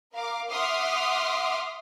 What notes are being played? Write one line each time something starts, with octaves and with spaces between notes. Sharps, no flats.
A#4 F5 D6
E5 F#5 C6 D6 D#6 F6